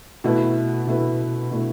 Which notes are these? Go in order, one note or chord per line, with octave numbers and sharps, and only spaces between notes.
B2 A3 E4 B4
B2 A3 E4 B4
B2 A3 E4 B4